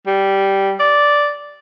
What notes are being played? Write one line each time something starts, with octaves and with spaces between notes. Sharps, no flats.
G3
D5